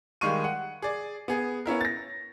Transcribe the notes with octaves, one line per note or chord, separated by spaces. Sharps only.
D#3 G3 G#3 F5 C#6 D#7
F#5
G#4 D5
B3 G#4
B3 C#4 E4 A#4
A6 A#6